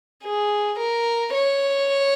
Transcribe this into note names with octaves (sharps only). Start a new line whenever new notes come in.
G#4
A#4
C#5